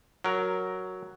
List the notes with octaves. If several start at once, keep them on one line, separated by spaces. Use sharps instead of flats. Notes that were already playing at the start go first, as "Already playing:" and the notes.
F#3 A#4